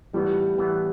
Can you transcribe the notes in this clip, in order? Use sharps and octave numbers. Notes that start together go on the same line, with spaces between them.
A2 E3 G3 B3
A2 E3 B3